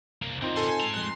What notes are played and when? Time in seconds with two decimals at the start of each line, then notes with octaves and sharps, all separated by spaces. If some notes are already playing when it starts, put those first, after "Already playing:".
0.22 C2 A#3
0.41 D3 A#3 C4 D#4 F4
0.56 A4 G#5 C6
0.80 G#3 A#5
0.94 F2 C6 F#6